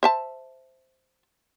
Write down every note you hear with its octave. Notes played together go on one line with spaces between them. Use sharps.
C5 E5 A5